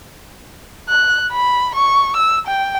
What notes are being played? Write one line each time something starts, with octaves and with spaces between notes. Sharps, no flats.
F#6
B5
C#6
E6
G5